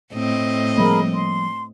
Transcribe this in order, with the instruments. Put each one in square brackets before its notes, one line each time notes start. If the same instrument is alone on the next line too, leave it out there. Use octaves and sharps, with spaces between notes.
[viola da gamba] A2 C4 D#5
[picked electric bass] F3 G3 A#3 [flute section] G#4 A#4 B5
[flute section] C6